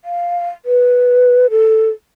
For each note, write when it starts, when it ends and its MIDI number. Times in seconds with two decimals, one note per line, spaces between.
0.05 0.49 77
0.65 1.47 71
1.51 1.89 69